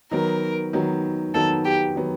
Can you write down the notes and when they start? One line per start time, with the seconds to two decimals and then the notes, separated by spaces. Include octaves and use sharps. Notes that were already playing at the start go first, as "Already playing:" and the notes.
0.11 D#3 F#3 B3 A#4
0.73 D#3 F#3 B3
1.34 D#3 F#3 B3 A4
1.65 G4
1.96 D#3 F#3 B3